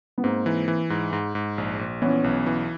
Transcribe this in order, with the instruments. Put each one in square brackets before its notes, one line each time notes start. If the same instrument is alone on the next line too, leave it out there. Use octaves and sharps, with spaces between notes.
[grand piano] B3
[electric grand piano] G#2 [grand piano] A#3 C4
[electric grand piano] E3
E3
G#2
G#2
G#2
A#1
A#1
[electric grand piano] E3 [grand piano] B3 C#4
[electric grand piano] B1
E3